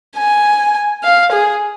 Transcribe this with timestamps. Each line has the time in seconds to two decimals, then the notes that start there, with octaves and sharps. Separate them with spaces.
0.17 G#5
1.03 F5
1.32 G#4